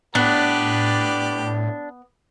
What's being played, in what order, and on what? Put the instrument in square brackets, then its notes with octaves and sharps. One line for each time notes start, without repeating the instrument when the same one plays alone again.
[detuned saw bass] A2 [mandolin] B3 [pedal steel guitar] D4 [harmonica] G4 B4 D5